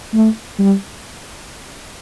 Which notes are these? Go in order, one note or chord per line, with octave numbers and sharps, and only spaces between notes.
A3
G3